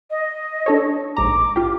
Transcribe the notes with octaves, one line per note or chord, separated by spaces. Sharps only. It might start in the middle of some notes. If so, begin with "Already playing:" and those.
D#5
D4 A4 C#5
A#1 G#2 A#5 D6
F4 G4